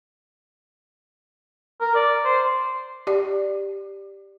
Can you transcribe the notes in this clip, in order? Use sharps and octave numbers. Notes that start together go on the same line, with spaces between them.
A#4
D5
C5
G4 D5